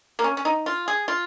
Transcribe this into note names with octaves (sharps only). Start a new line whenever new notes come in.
A#3
C#4
C#4
D#4
F4
G#4
F4